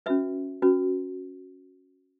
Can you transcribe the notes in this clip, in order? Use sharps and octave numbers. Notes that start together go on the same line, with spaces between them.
C#4 F#4 B4 E5
C#4 F#4 B4